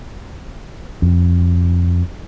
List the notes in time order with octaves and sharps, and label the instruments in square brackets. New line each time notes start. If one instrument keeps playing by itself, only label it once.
[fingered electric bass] F2